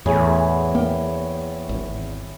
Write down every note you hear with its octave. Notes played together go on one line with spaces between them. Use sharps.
E2 A2 E4 G#4 C#5
A#3 G5
G#1